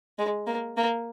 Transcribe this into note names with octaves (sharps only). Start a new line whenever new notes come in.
G#3
A#3
A#3